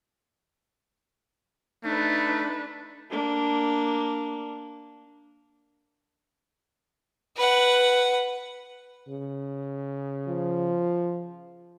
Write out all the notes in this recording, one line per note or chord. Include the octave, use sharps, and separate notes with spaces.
A3 D4 D#4 B4
A#3 D4
B4 F#5
C#3
F3